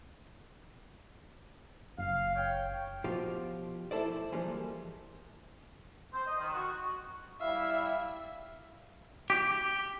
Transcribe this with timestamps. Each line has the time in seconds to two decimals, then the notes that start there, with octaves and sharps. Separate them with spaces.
1.99 F#1 F5
2.36 C#5 G5
3.04 B2 F3 F4 G4
3.91 E4 A4 C5 D5
4.32 E3 F3 G3 G#3 A#3
6.14 C5
6.27 D#5
6.40 D#3
6.53 F#4
7.40 G3 E4 E5 F5
9.30 G4